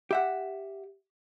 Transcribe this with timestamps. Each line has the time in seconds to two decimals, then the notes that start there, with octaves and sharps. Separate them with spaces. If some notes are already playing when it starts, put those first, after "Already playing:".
0.11 G4 E5 F#5